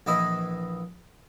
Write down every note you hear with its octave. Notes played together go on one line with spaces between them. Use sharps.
A#1 E3 E4 D#5